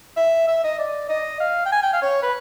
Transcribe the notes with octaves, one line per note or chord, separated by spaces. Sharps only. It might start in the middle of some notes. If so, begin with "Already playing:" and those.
E5
E5
D#5
D5
D#5
F5
G5
G#5
G5
F5
C#5
B4